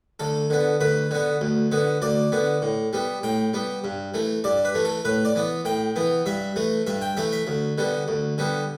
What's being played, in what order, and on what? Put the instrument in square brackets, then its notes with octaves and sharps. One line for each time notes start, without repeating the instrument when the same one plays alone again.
[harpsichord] D2 A4
D3 B3
D2 B4
D3 B3
D2
D3 B3
D2 D5
D3 B3
A2
G3 B3
A2 G5
G3 B3
G2
E3 A3
G2 D5
B4
E3 A3
A4
A2 B4
D5
E3 B3
A2 G5
E3 B3
G2 E5
E3 A3
G2 E5
G5
E3 A3 E5
E5
D2
D3 G3 B3
D2
D3 G3 B3